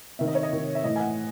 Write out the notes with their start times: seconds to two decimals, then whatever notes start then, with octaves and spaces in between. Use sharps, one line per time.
0.19 C3 D#3 E5
0.27 D#5
0.35 C#5
0.43 D#5
0.51 C3 D#3
0.75 E5
0.84 A2 E3 D#5
0.96 G#5
1.00 F#5